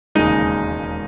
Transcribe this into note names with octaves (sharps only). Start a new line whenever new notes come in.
E1 D#2 C#3 G#3 D#4 D#5